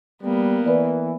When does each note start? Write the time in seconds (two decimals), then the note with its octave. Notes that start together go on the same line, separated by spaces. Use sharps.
0.23 G3 A#3 B3
0.66 E3 B4 D5